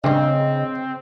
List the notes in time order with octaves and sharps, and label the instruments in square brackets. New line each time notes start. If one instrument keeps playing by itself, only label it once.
[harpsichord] A1 G2 [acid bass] C#3 [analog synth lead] C4 [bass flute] D#5